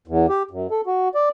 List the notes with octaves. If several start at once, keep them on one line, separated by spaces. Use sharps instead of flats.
E2
G4
F#2
A4
F#4
D5